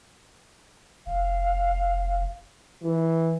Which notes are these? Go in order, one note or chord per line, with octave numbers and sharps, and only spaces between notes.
F1 F5
E3